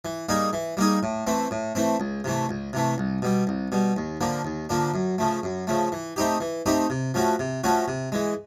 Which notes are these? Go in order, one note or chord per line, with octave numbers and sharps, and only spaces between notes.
E3
G3 A#3 D#4 G#4
E3
G3 A#3 D#4 G#4
A2
E3 A3 C4
A2
E3 A3 C4
C#2
C3 E3 A3
C#2
C3 E3 A3
C2
B2 G3
C2
B2 G3
D#2
D3 F3 A#3 D4
D#2
D3 F3 A#3 D4
F#2
C#3 F3 A3
F#2
C#3 F3 A3
E3
A3 C4 D#4 G4
E3
A3 C4 D#4 G4
C3
F3 A3 C#4 F#4
C3
F3 A3 C#4 F#4
C3
E3 G#3